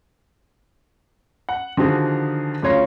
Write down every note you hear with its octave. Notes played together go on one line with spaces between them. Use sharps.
F#5
D3 D#3 F3 F#4 G#4
D2 C#3 F4 C#5 C6 A#6